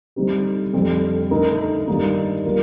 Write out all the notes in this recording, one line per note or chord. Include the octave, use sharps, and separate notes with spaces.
D3 G3 C4 D#4 G4
F2 D3 G3
D3 A3 D#4 A#4
G2 D#3 A#3 D#4
G3 A#3 F4 A#4